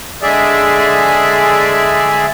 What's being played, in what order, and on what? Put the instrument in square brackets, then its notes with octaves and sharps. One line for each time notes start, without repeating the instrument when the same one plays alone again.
[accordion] D3 G#3 G#4 D5 E5